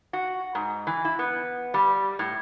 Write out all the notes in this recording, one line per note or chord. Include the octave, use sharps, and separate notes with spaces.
F#4
G#2
E3
E4
B3
G3
A2